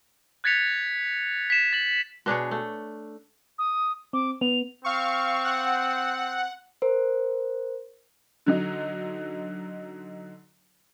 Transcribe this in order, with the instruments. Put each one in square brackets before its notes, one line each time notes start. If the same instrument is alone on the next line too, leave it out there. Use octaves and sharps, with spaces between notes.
[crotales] F#6 G#6 A6 B6 C#7 F7
B6 E7
A6 F#7
[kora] B2 D4 G#4 C#5
A3
[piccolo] D#6
[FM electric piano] C4 [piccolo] D6
[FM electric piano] B3 [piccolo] F7
[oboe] C4 [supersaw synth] F5 C#6
[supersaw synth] F#5
[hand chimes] A#4 C5
[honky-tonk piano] D3 F#3 D#4